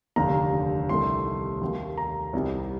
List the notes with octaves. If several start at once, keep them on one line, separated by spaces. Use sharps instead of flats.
F1 D#2 D3 A#5
C2 C3 D#3 A3 C6
D#2 D#3 A3
A#5
C2 C3 D#3 G3